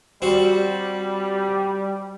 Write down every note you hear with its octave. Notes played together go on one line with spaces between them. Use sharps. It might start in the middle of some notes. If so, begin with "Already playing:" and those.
G3 C4 F#4